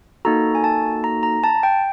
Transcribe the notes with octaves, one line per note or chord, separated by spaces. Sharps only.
A#3 D#4 F#4 A4 A#5
G#5
A5
A#5
A#5
A5
G5